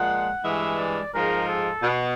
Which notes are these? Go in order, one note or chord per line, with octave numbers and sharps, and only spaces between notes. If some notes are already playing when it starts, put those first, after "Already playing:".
Already playing: A#2 F3 G#3 F#5
G2 E3 G#3 E5
D5
G#2 F3 G#3 A#4
A4
B2